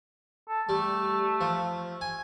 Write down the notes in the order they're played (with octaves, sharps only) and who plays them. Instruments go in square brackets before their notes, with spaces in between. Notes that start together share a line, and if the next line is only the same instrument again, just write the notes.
[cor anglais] A4
[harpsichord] G3 [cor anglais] A3
[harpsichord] F3
G#5